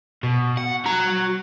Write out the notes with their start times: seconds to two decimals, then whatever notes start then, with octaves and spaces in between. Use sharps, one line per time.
0.23 B2
0.57 F#5
0.85 F#4 A#5